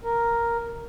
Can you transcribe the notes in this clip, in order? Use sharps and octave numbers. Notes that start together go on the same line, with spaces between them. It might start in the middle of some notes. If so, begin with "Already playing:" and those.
A#4